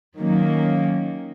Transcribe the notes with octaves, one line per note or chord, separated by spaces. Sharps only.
D#3 F#3 A#3 C#4